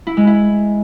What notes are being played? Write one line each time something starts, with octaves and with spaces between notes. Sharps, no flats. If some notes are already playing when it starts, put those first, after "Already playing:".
E4
G#3
E4